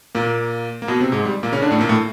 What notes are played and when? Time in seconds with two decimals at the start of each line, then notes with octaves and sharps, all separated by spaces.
0.15 A#2 A#3
0.82 A#3
0.87 B2 B3
1.00 C3 C4
1.12 G#2 G#3
1.25 G3
1.43 A#2 A#3
1.52 C#3 C#4
1.62 D3 D4
1.71 A2 A3
1.80 A#2 A#3
1.89 A2 A3